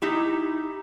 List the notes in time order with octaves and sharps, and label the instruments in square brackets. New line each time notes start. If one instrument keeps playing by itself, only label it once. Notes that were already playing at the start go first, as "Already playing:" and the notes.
[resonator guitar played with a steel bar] D#4 E4 G4